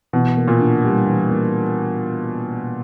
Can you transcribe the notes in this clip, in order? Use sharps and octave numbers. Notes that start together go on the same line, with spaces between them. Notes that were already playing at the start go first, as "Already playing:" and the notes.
B2 E3
A#3
A#2
D4
G3
E3
A#3